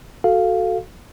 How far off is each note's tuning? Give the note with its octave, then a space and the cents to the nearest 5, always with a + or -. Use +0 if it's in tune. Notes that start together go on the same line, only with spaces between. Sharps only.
F#4 +0 A4 +0 F5 +0